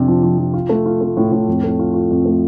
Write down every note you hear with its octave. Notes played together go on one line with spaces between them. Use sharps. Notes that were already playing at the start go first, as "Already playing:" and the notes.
Already playing: F2 C3 D4
F3
F3
F3
F4
A3
F4
A3
A2
A2
F2
A3
F4
F4
F2
A3